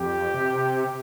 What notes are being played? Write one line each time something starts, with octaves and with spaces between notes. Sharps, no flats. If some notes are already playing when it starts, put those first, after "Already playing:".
Already playing: F2 G4
C3